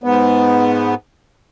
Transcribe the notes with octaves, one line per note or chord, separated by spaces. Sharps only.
G#2 B3